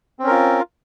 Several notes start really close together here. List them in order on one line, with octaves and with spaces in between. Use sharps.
C4 C#4 A#4 F4